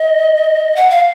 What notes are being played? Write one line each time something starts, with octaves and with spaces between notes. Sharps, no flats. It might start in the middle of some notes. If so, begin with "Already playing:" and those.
Already playing: D#5
F#5
F5